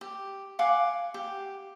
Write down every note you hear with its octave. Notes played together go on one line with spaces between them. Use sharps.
G4
F5 F#5 G#5 D6
G4